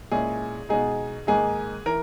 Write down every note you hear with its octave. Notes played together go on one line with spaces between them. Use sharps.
A#2 G#3 C#4 E4 G#4
B2 G#3 D#4 G#4
G#2 D#3 A#3 D#4 G#4
E3 A#4